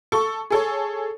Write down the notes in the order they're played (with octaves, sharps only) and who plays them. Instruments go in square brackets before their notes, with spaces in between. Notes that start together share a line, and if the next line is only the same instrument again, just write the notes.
[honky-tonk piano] A4 C#6
G#4 A4 C#5